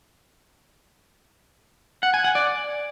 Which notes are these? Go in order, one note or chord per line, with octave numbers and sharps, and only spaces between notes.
F#5
G#5
F#5
D5